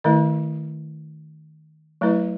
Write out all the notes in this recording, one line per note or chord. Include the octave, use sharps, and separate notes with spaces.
D#3 A3 E4 B4 D#5
F#3 A3 E4 B4 D#5